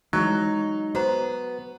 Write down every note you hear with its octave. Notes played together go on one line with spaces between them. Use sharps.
E3 F#3 G#3 D#4
B3 F#4 C5 A#5